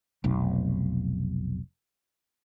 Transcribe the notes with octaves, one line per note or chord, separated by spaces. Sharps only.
F1 B1